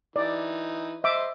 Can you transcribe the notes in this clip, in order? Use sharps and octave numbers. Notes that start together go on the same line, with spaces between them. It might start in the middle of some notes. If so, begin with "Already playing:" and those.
E3 D#4 D5
C5 D#5 E5 D6